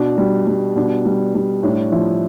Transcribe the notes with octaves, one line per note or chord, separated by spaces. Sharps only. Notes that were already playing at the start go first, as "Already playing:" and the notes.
Already playing: B2 D4
G3
G3
B2 D4
G3
G3
A2 D4
F3 E4